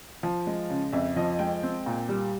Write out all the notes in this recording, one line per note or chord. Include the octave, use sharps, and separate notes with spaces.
F3
G#3
C#3
F2 E5
F3 D#5
G#3 G5
C4
A#2
G3